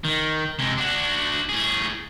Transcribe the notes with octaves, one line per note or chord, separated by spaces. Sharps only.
D#3
C3 G#3
D4 F#4
A2 G#4